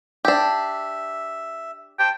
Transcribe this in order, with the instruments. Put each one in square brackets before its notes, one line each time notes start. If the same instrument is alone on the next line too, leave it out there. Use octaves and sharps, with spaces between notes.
[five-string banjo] D4 G4 [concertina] E5
[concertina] C5 A5 [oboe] G5